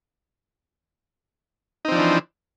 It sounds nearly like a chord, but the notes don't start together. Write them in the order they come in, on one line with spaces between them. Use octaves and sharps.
D#4 C4 F3 D4 E3